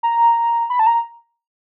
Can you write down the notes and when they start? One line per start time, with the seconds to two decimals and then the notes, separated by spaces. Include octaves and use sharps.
0.03 A#5
0.70 B5
0.79 A5
0.87 A#5